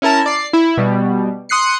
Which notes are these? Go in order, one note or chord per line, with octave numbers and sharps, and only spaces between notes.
C#4 E4 A#4 A5
D5 C7
E4
B2 G3
C6 D#6 F#6 C7 C#7